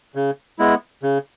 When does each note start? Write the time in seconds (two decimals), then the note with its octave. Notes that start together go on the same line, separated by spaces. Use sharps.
0.15 C#3
0.59 G#3 B3 E4
1.03 C#3